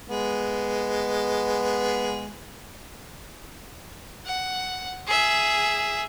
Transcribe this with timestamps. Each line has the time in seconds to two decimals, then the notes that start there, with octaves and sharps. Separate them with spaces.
0.09 G#3 B3
4.26 F#5
5.07 G#4 E5